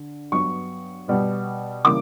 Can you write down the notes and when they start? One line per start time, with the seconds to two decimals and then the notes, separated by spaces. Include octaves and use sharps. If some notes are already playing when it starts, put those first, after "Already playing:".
Already playing: D3
0.32 G2 F#3 B3 C#6
1.08 B2 G3 B3
1.84 C#3 E3 G3 A#3 D6